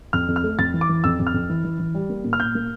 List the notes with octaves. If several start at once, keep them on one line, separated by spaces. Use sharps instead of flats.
F2 F6
F2
F6
A3
F2 A6
E3
D6
E3
F2 E6
F2
F6
F2
E3
E3
E3
G3
A#3
A#2
F6
A#2 G6
A#3